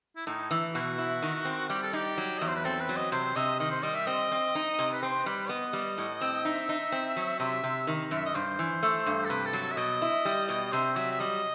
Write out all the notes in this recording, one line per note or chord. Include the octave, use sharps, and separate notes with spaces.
E4
A2 D#4
E3
B2 F#4
E4
D#3
C4
G3 G4
A4
D#4 G4
F#3
E2 D#5
C5
B4
C4 A4
B4
F#3
D#5
C3 C5
C3 D#5
D#3 D#5
C5
G3 D#5
E5
C4 D#5
C4
D#4
C3
B4
C4 C5
G3 B4
B3 D#5
G3
A2
C4
D#4 E5
D#4
C4
F#3
C3 E5
C3
D#3
F#2
E5
D#5
G2 C5
E3
A3
G2
A4
C3 B4
A4
F#3
A4
E5
B2 D#5
E4
G3
B2
C3 C5
F#3 E5
E5
G3 D#5